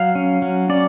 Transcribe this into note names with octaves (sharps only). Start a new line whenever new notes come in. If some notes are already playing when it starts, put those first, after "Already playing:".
Already playing: F#3 F5
C#4
F#3
C#4 D5